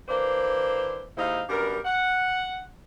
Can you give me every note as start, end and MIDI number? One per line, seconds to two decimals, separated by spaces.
0.08 1.06 52
0.08 1.06 58
0.08 1.06 62
0.08 1.06 72
1.18 1.41 39
1.18 1.41 44
1.18 1.41 63
1.18 1.41 64
1.18 1.41 72
1.18 1.41 77
1.49 1.79 42
1.49 1.79 55
1.49 1.79 59
1.49 1.79 62
1.49 1.79 70
1.85 2.62 78